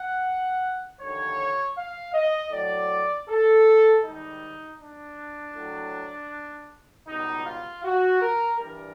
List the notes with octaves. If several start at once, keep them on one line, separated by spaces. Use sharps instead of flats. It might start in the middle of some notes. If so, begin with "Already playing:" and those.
Already playing: F#5
D#2 D3 F3 C#5
F5
D#5
A2 F#3 D5
A4
G#2 D#3 G3 D#4
D4
A2 F#3
C#2 B2 G3 D#4
F4
F#4
A#4
G2 E3 G3 A#4